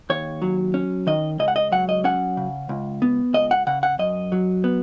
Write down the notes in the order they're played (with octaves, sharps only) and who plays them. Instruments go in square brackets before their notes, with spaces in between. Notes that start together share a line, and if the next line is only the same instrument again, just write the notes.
[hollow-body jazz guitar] D#2 C#5
F#3
C#4
D#3 D#5
C#2 D#5
F#5
D#5
F#3 F#5
D#5
C#4 F#5
C#3
C#2
B3
C#2 D#5
F#5
C#3 F#5
F#5
F#2 D#5
F#3
B3